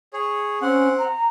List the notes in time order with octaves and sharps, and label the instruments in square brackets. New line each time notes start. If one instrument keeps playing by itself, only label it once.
[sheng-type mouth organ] G#4 C#5
[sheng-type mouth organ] C4 F#5 [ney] C#4
[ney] A#5